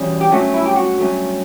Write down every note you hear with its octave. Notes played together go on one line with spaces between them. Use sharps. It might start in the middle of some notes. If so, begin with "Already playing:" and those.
Already playing: E2 B2 G3 C#4
G4
G2 F#3 A3 C#4 F#4
E4
G4
F#4
G2 F#3 A3 C#4